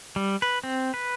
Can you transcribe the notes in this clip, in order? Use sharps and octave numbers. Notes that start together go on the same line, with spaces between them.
G3
B4
C4
B4